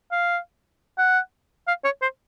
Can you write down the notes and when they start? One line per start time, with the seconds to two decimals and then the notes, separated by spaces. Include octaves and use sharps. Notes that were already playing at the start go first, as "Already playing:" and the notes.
0.11 F5
0.98 F#5
1.67 F5
1.84 C#5
2.02 C5